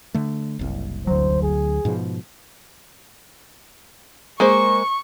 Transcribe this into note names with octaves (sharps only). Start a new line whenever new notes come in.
D3 A3
F#1 C2
D2 F#3 C5
G#4
G#2 B2 F3
G#3 A#3 C5 C#6